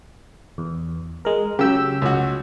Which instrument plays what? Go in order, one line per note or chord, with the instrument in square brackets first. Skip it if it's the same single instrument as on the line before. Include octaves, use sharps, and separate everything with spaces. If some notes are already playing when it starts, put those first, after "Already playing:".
[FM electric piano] E2
G#3 A#4
[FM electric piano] C#3 E6 G6 [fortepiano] F#3 G4
[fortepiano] C#2 F#4